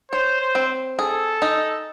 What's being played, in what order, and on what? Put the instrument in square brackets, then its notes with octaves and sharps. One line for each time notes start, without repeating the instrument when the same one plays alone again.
[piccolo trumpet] C5 [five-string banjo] C#5
[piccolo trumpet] C5
[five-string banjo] C4
[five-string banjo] G#4 [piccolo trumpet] A4
[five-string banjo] D#4